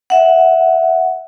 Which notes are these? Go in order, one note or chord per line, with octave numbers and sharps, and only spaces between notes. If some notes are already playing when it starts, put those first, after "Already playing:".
E5 F#5